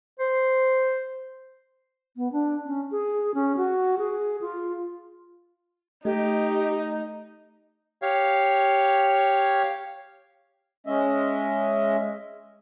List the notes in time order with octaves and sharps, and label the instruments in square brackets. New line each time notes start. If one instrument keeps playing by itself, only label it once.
[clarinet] C5
[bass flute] B3
D4
C#4
G#4
C#4
F#4
G#4
F4
[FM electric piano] A3 [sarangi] D#4 [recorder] G4 [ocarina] D#5
[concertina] G4 C#5 F5
[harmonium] G#3 C#4 D#5 E5